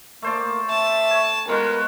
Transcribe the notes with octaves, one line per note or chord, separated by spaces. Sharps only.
A3 A#3 C5 D5
E5 A5
C#5
B2 G#3 F4 A#4 B4